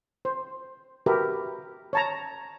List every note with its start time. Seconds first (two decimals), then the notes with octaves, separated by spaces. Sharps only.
0.25 C5
1.06 F#4 G4 A#4 B4 E5
1.93 C#5 A5 A#5